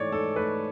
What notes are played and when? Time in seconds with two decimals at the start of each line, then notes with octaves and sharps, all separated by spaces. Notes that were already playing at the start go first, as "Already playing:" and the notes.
Already playing: G#2 E3 A3 C#5 D5
0.12 G#2 A4
0.36 A3 B4